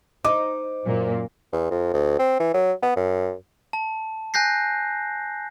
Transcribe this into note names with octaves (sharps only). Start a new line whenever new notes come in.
D#4 C5 D6
F#2 A#2 A#3
E2
F2
D2
C4
E3
F#3
B3
F#2
A5
G#5 F#6 G6 A#6 C7